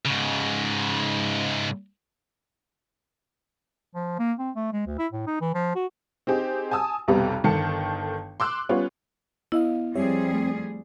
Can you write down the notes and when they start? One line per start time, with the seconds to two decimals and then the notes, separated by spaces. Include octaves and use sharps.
0.05 G#2 C#3
3.95 F3
4.19 A#3
4.39 C4
4.56 A3
4.73 G#3
4.87 D2
4.98 E4
5.12 A2
5.27 D#4
5.41 E3
5.54 F3
5.75 F#4
6.27 C4 D#4 G4 G#4
6.71 G#5 A5 D#6 E6
7.08 B1 F2 C3 G3 B3
7.44 G1 D#3 A4 A5 C#7
8.40 C6 D6 E6 F#6
8.69 G3 B3 C#4 F4
9.52 B3 E4 D#5 F5
9.95 F2 G3 C4 G4 G#4 C#5 E5
10.33 A3